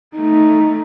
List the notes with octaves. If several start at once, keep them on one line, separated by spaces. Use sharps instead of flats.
A3 D#4